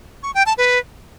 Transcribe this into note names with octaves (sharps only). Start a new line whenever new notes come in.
C#6
G5
A5
B4